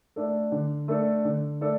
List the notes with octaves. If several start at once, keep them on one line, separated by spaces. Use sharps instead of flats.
A3 D4 A4
D3
A3 D4 A4
D3
A3 D4 A4